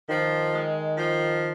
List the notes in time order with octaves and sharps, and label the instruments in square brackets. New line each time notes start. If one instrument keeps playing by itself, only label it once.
[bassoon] D#3 [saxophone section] F3
[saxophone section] G#3
F3